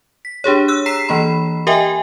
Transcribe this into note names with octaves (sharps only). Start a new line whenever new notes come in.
B6
D4 G4 G#4 C#5
E6 F#6
A#5 B6 C7 E7
E3 A#3 B5
G4 A#4 D#5 E5 G5 G#5